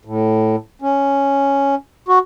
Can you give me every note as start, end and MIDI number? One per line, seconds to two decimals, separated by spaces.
0.05 0.56 45
0.82 1.75 61
2.08 2.19 66